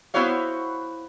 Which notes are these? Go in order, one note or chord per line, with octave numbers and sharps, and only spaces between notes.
B3 E4 F#4 C5 C#5 F5